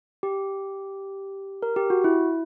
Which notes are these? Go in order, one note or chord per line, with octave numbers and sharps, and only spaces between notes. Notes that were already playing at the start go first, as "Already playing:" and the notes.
G4
A#4
G4
F#4
E4